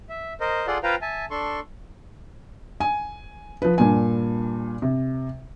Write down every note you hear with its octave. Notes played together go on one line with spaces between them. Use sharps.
E5
A#4 C5 D#5
F4 G#4 A4 D5 F#5 C6
F4 B4 C5 F5 G5 A#5
E5 G#5 A5
D4 A4 C6 C#6
G#5
F3 B4
G2 A#2 G#5
C3